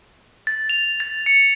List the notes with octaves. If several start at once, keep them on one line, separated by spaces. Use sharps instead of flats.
A6
F7
A6
C#7